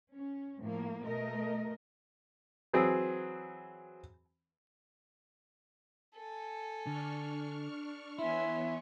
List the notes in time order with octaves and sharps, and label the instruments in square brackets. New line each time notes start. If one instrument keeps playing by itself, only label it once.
[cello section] C#4
A2 F3 A#3
B2 A3 A#4 D#5
[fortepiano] E3 F#3 C4 G#4
[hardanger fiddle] A4 G#5
[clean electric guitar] D3 [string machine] D4 C#6 F6
[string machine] E3 B3 C#5 [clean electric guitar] E4 [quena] E5 [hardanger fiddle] G#5 C6